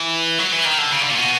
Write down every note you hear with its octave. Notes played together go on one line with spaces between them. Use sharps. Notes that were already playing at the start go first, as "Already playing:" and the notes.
Already playing: E3
F#3
E3
D#3
D3
C#3
D3
A#2
B2